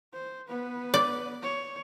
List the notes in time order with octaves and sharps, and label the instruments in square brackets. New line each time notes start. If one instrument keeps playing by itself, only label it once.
[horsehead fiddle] C5
B3 B4
[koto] D5
[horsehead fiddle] C#5